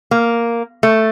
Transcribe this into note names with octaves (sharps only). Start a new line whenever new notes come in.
A#3
A3